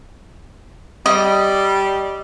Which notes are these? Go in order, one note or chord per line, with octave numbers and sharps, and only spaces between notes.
G3 D#5